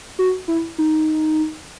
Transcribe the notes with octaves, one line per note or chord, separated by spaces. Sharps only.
F#4
E4
D#4